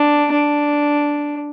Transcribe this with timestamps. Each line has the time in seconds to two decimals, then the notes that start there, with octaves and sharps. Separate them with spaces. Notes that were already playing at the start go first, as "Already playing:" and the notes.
Already playing: D4
0.32 D4